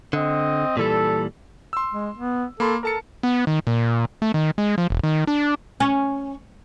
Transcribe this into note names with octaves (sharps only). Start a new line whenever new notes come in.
D3 C4 D#5
A#2 E3 G3 A4
C6 E6
G#3
B3
A#3 A4 B5 C6
A4 A#4 A5 C#7
B3
D#3
A#2
A3
D#3
G#3
F3
E1
D#3
D4
C#4